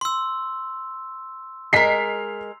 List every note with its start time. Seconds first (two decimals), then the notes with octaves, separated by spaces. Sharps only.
0.01 C6 E6
1.73 G#3 A#4 B6 C7